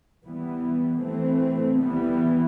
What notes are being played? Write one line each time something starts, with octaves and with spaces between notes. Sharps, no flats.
E3 G3 B3
E3 A3 C4
E3 G3 B3